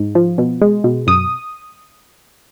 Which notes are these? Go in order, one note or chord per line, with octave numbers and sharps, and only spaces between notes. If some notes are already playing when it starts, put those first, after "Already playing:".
Already playing: G#2
F3
B2
G#3
B2
F#2 D#6